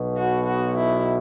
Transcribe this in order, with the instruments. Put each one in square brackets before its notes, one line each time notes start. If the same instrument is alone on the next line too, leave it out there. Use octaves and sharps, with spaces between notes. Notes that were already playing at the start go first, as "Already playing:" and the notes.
Already playing: [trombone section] B1 B2
[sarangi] F#4
F#4
E4